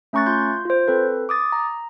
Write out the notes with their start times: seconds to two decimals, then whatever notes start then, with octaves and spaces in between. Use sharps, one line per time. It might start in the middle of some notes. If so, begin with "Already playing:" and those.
0.13 A3 C#4 A#5 C#6 F#6 A6
0.26 F4 C6 G6
0.65 F4 C5
0.88 C4 A4 B4
1.29 D6 D#6 A6
1.52 A#5